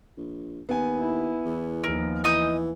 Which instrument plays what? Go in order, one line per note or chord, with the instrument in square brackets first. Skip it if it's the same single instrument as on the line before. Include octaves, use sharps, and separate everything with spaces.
[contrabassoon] A#1
[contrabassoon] D#2 [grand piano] B3 G#5
[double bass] E4
[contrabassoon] E2
[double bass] D#2 F3 [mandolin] A#4
[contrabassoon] E3 [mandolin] D#4 D#6 G6